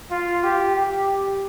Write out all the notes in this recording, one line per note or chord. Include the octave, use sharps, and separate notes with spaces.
F4
G4
G4